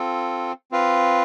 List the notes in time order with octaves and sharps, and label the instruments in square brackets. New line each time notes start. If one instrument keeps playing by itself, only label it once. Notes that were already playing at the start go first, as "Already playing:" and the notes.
Already playing: [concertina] C4 F4 A4
C4 F4 B4 F5